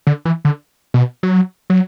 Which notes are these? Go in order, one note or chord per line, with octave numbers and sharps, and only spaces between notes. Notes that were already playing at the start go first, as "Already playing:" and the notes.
D3
E3
D3
B2
F#3
F#3